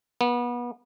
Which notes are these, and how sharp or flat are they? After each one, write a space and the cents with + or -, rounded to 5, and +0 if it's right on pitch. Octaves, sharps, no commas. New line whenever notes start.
B3 -30